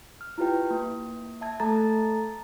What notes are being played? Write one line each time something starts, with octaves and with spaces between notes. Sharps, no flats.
F6
E4 F4 G4 B4 G5
A#3
E5 A5 G#6
A3 A4 A5 A#5 G#6 A6